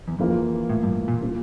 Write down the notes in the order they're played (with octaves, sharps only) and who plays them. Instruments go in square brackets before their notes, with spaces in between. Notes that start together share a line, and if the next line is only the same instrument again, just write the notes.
[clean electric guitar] E2
[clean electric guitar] F2 [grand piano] E3 A#3 F4
[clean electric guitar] A2
G2
A#2
[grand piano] G3 A#3 F4